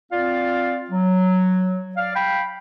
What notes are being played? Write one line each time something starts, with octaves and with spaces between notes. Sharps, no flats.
C4 F4 D5 F5
F#3
D5 F5
F5 G5 B5